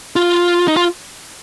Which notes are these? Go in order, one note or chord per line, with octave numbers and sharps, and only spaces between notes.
F4
D#4
F4